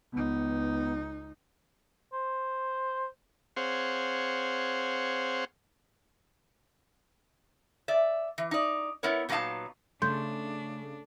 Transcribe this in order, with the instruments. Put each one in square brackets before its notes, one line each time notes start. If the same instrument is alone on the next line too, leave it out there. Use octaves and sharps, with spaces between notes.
[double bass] C#2 D#4 [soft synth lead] B3
[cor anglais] C5
[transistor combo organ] C4 G#4 C5 C#5 F5 F#5
[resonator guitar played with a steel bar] D5 E5
E3
D#4 D5
B3 E4 A#4 C#5
A#2 F#3 B3 D#4 F5 A5
[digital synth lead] C#3 [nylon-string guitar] A3 [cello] D4 [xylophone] C6 G6